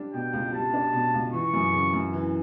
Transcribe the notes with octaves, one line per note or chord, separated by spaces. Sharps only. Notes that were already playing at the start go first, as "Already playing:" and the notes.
Already playing: G3 D4
B2 G5
C#2
G3 A5
D4
B2
C#2
E3 C#6
F#2
C#3
F#2
E3